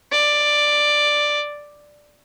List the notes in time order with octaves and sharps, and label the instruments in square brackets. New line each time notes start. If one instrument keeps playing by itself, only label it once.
[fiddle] D5